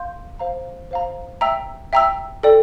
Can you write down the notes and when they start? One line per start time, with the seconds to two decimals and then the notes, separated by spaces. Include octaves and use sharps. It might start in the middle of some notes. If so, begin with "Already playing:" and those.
Already playing: F5 C6 G6
0.39 C5 F5 A#5
0.91 C5 F5 A#5
1.41 E5 G5 A#5 E6
1.93 E5 G5 A#5 E6
2.43 A4 D5 G5